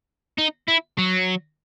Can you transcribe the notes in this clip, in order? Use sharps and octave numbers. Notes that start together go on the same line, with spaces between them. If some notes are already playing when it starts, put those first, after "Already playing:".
D#4
E4
F#3